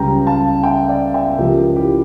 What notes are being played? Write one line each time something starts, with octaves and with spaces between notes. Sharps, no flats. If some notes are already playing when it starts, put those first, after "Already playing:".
Already playing: C#2 C#3 G3 G5 A#5
F5 A5
E5 G5
D5 F5
E5 G5
C#2 C#3 F3 G4 A#4
E4 G4